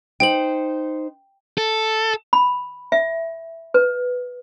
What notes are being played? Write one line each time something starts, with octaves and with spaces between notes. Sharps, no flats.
D#4 C5 G5 F#7
A4
B5
E5
B4